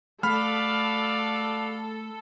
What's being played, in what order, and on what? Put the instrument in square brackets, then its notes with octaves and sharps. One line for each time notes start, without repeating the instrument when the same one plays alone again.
[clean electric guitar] A3 [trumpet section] F#4 D5 F5 [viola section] A4 [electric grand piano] B5 F6